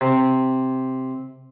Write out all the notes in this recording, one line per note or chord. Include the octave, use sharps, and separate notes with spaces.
C3